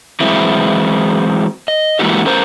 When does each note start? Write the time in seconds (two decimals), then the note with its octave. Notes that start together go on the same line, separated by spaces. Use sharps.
0.20 E3 F#3 G#3 C4 E4
1.68 D#5
1.99 E3 G#3 A#3 E4 F#4 G4
2.26 C#4 A4 A#4 C5